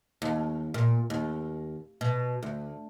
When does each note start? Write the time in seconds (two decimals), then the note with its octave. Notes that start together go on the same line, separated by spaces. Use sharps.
0.22 D#2
0.74 A#2
1.10 D#2
2.01 B2
2.43 D2